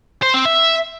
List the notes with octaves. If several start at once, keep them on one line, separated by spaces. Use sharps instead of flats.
C5
C4
E5